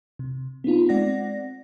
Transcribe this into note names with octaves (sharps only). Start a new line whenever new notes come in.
C3
B3 C4 D#4 F4
G#3 C4 D5 F#5 A#6